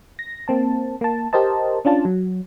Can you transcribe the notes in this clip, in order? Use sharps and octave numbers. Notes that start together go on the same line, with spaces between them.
A#6
A#3 C4 A5
A#3 A5
G4 A#4 C5 D#5 A5
C#4 D4 F4 A5
F#3